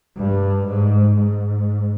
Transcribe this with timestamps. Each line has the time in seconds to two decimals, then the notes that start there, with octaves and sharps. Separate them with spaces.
0.16 G2
0.67 G#2
1.16 G#2